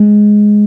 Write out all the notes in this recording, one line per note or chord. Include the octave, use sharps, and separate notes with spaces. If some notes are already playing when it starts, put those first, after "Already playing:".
Already playing: G#3